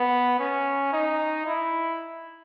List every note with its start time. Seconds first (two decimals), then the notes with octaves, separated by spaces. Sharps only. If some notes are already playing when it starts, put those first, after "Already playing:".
Already playing: B3
0.40 C#4
0.93 D#4
1.47 E4